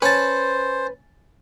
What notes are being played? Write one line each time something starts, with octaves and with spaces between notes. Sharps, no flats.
C#4 B4 C5 A5